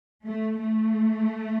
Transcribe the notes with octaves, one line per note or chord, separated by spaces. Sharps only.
A3
A3